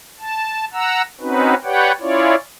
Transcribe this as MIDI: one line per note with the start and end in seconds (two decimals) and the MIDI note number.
0.19 0.65 81
0.73 1.02 78
0.73 1.02 82
0.73 1.02 88
1.21 1.54 60
1.21 1.54 61
1.21 1.54 63
1.21 1.54 66
1.21 1.54 71
1.64 1.92 67
1.64 1.92 71
1.64 1.92 73
1.64 1.92 74
1.64 1.92 78
1.64 1.92 79
2.00 2.35 61
2.00 2.35 64
2.00 2.35 65
2.00 2.35 73
2.00 2.35 74